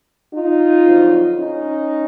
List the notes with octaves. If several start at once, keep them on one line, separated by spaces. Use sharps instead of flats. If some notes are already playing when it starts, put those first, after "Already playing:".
D#4 F4
F2 D3 F#3
C#4 D#4